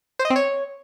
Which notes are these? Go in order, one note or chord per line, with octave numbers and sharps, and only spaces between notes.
C5
D#5
C4
C#5